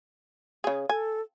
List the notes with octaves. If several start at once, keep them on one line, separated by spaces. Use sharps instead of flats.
C#3 G#4
A4 G#5